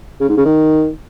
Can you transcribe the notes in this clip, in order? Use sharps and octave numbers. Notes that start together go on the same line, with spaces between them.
C#3
G#2
C#3
D#3